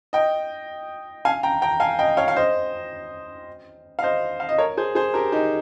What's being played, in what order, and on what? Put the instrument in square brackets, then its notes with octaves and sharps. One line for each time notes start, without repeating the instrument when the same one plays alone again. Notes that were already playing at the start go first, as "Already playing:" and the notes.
[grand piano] D#5 G5
F5 G#5
G5 A#5
G5 A#5
F5 G#5
D#5 G5
C#5 F5
F5
C5 D#5
F5
C5 D#5
F5
D#5
A#4 C#5
G#4 C5
G#4 C5
G4 A#4
D#4 G4